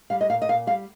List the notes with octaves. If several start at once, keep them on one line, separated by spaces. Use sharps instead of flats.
G3 F5
D#5
A#2 F5
D#5
A#2 F5
G3 F5